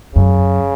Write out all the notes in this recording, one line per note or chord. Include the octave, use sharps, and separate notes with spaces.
F#2 C#3